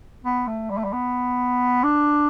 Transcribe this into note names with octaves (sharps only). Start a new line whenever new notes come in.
B3
A3
G3
A3
G3
B3
D4